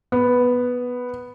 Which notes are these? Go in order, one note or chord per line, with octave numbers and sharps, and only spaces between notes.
B3